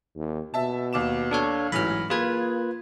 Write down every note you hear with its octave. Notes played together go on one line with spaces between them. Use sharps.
D#2
B2 E5 A5
D#2 D6 E7
D4 A4 C#5
A1 G#2 E3 F#3 B5 F6
A#3 F4 G#4 B4 G#6